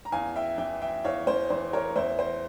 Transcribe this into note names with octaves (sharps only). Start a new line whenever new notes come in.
A#5
E2 F5 G#5
E5 G5
E3 E5 G5
E5 G5
E2 C#5 F5
C5
E3 C5
A#4 C#5
E2 C5 E5
C5